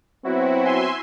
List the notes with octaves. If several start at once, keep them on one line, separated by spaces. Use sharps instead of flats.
F#3 B3 C4 E4 F#4
E5 G#5 C6